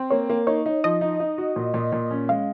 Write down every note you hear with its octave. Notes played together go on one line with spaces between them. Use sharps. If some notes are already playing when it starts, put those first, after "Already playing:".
Already playing: C4
A#3 C#5
A#3
D#4 C#5
D#4
F3 D#5
D#4
D#4
F#4
A#2
A#2
A#2
C#4
G#3 F5